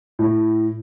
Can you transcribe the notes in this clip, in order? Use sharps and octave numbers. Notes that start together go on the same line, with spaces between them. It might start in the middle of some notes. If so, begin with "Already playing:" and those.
A2